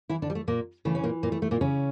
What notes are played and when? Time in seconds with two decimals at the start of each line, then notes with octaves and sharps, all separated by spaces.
0.09 E3 E4
0.22 D3 D4
0.30 G3
0.35 A3
0.47 A#2 A#3
0.85 C#3 E3 A3
0.95 C#4
1.04 A#2 A#3
1.23 A#2 A#3
1.32 A3
1.42 A3
1.51 A#2 A#3
1.61 C#3 C#4